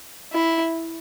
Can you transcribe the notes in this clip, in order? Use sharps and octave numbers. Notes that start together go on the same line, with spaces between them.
E4